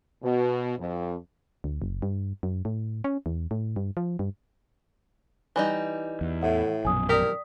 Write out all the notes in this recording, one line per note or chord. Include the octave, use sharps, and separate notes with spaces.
B2
F2
D2
F#1
G2
F#2
A2
C#4
E2
A2
G2
F3
G2
E3 G3 D#4 G#5
E2
A2 A4 E5 F#5
A#1 F#2 B2 G#5 D#6
G4 A#4 D5 D#6 B6